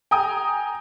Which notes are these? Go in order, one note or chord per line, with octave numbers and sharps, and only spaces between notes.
G5 G#5 A#5 D#6